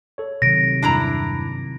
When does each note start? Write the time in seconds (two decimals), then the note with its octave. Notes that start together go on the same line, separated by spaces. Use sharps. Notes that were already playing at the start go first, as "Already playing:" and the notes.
0.18 A4 C#5
0.42 C3 D#3 F#3 A#6 D7
0.82 E2 G2 D4 E4 A#5